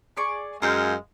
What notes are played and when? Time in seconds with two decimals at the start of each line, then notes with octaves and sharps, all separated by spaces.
0.17 G#4 D5 C#6
0.62 F#2 G#3 F4 F5 G5